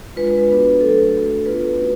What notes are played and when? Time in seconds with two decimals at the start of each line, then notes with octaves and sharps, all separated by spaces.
0.16 G#3 D4 F4 B4
0.27 B4
0.39 B4
0.48 B3 D4 F#4
0.81 F#3 A3 D4 A4
1.14 A3 D4 F#4
1.45 B3 D4 F4 B4
1.78 A3 C#4 F#4